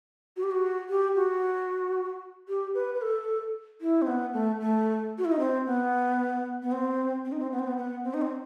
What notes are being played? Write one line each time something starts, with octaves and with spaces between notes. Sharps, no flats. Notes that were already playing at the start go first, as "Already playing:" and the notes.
F#4
G4
F#4
G4
F#4
G4
B4
B4
A4
E4
C4
B3
A3
A3
F#4
E4
D#4
C4
B3
B3
C4
C4
D#4
C4
B3
C4
B3
B3
C4
D#4
C4